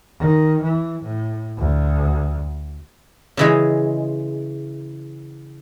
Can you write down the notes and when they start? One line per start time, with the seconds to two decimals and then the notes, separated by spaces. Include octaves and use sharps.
0.19 D#3
0.62 E3
1.02 A2
1.58 D2
3.37 C#3 E3 G#3